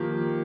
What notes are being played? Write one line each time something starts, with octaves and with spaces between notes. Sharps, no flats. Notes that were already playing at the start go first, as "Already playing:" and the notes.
Already playing: D#3 F3 A#3 G4